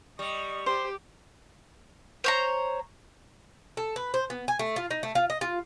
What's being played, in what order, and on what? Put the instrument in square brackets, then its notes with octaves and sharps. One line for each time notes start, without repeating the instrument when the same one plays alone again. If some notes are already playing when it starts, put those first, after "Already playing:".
[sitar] G3 [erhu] D#5 [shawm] C#6
[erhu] G4 [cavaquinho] C5 [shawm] C6
[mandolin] C5 C#5 A#5
[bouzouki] A4
B4
C5
B3
G#5
A3
F4
D#4
A3
F4
D#5
F4